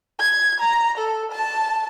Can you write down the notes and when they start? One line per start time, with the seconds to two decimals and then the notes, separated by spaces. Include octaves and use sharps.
0.20 G#6
0.60 A#5
0.97 A4
1.31 A5